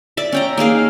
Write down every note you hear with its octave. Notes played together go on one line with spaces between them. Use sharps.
D5 E5
C#4 G5 A#5
A#3 D#4 G#4 F5